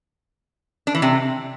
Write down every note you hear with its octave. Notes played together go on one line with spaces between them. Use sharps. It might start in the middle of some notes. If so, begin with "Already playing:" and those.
D4
E3
C3